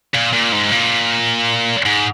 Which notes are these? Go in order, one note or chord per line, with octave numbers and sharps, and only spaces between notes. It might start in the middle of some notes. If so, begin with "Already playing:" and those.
A#2
A#2
G#2
A#2
G#2